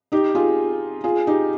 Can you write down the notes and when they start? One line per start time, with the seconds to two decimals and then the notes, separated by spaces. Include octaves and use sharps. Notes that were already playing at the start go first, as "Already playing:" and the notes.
0.12 D#4 G4
0.35 F4 G#4
1.04 F4 G#4
1.27 D#4 G4